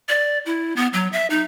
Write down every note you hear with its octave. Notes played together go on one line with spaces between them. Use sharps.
D5
E4
B3
F#3
E5
D#4